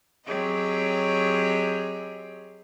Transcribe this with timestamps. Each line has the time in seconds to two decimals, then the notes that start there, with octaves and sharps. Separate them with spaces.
0.24 F#3 C4 G4 G#4 C#5 D#5